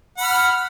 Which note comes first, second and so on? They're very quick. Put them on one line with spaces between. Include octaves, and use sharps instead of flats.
F#5 B5 F6